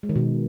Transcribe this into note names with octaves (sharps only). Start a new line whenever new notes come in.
G#3
D#3
B2